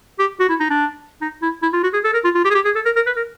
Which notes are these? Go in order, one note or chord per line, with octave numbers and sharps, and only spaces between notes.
G4
F#4
E4
D#4
D4
D#4
E4
E4
F4
F#4
G#4
A4
A#4
F4
F4
G4
G#4
G4
G#4
A4
A#4
A#4
B4
A#4